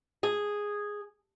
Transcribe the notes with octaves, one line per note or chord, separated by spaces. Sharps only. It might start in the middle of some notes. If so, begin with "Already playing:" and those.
G#4